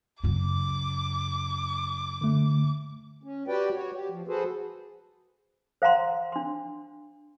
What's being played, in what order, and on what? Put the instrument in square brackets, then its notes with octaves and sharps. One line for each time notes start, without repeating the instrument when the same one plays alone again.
[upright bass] F#2 C#3 [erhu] D6
[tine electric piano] D3 A3
[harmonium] C#4
F#4 G4 B4 D5 G5
F#4 C#5
G4
F3
F#4 G#4 A4 B4 C5
[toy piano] C5 F5 F#5 A#5 C6
D4 C6